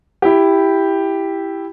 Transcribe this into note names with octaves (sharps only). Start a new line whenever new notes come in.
E4 G4